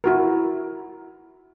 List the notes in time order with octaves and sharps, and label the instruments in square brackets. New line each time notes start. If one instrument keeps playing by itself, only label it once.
[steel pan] E4 F#4 A#4